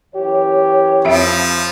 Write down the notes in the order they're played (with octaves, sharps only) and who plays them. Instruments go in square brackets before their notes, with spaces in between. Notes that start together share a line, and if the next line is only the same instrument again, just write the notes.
[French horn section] F#2 E3 C#5 [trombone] G4
[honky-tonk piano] F2 E5 D7 [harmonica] F3